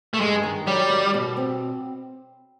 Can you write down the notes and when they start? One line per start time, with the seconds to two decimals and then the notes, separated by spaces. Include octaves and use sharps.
0.14 A3
0.20 G2 G#3
0.43 D#3
0.67 F#3 G3
0.90 D#3
1.14 B2
1.37 C4